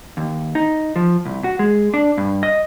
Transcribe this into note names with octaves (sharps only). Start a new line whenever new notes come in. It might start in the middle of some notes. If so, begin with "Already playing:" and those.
D#2
D#4
F3
C2
F#4
G#3
D4
G2
D#5